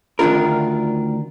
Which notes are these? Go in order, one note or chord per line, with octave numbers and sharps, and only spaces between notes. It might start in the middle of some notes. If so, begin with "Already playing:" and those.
D2 D#3 D4 F4 A#4